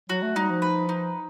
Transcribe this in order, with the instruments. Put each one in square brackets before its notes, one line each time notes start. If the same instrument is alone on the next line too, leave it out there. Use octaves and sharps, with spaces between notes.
[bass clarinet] F#3 [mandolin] F#4
[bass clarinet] A3
[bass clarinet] G3 [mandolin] D#4
[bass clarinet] F3
[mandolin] B4
D#4